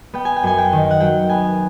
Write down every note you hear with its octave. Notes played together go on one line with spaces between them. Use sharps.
B3 G5
G#5
G5
F#2 G#5
G5
D#3
F#5
F#3 G5
B3 G#5